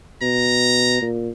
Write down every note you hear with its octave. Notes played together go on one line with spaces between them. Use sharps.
B2 A#5
A#2